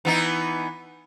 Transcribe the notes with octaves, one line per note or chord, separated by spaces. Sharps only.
E3 B3 D#4